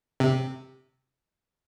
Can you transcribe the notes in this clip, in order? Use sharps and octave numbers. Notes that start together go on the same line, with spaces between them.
C3